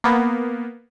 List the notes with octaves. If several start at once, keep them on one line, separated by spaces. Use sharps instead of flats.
A#3 B3